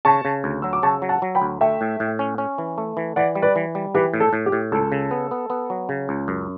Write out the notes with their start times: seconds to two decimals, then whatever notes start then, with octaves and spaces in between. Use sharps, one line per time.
0.05 C#3 A5 C#6
0.25 C#3
0.44 D2
0.62 F#3 E6
0.73 D6
0.83 C#3 A5 C#6
1.02 F#3
1.09 F#5 A5
1.22 F#3
1.35 G5 B5
1.42 D2
1.61 A3 E5 G5
1.81 A2
2.00 A2
2.19 C#4
2.38 C#4
2.58 E3
2.78 A3
2.97 E3
3.16 E3 D5 F#5
3.35 G3
3.42 B4 D5
3.56 E3
3.75 G3
3.95 E3 G4 B4
4.14 A2
4.20 A4
4.33 A2
4.46 G4
4.52 A2
4.72 C#2 A4
4.92 C#3
5.11 B3
5.31 B3
5.50 B3
5.70 F#3
5.89 C#3
6.09 C#2
6.28 F#2